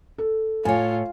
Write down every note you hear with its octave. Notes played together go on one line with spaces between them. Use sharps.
A4
A2 F4 C#5 G#5